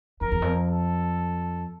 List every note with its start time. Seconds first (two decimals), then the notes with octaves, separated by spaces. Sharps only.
0.21 F2 A#4
0.32 E2
0.42 F2
0.68 A4